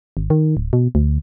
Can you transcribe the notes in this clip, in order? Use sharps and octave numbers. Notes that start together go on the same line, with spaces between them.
G#1
D#3
D1
B2
D2